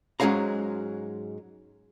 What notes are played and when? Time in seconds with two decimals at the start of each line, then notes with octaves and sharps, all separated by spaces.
0.20 G#2 F#3 G#3 C#4 F5 A#5